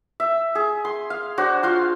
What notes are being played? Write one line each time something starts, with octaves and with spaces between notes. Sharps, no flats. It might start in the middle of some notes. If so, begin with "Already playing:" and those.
E5
G#4
C6
F5
D4 F#4 C5
F4 F5 C6